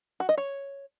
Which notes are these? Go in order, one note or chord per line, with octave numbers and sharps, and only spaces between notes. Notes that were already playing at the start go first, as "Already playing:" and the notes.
F#4
D#5
C#5